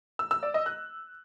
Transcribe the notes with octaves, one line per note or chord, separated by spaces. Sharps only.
E6
E6
D5
D#5
F#6